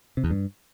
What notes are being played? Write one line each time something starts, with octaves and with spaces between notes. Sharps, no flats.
C3
E2
G2